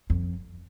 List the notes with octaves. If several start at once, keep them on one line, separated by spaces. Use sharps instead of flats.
F2